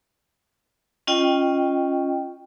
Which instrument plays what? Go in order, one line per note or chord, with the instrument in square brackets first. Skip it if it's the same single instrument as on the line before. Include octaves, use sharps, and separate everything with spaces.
[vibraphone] C#4 F4 D#5 G5